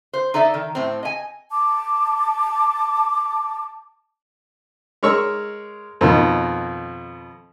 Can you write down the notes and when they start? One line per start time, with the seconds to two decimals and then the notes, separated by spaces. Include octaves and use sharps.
0.13 C5
0.34 D#4 A4 D5 E5
0.54 D#3
0.75 A2 C4
1.03 D#5 G#5
1.50 A5 D6
5.03 G#3 A#4 C#5 C#6 E6
6.01 F2 B2 D#3